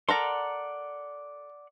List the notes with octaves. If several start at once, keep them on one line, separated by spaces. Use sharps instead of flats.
A4 A#4 D5 F#5 A#5 C6